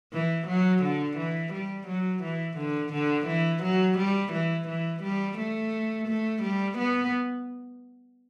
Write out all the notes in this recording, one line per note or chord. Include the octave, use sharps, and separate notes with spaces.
E3
F#3
D3
E3
G3
F#3
E3
D3
D3
E3
F#3
G3
E3
E3
G3
A3
A3
G3
B3